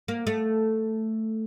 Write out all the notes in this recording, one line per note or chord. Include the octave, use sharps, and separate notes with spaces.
A#3
A3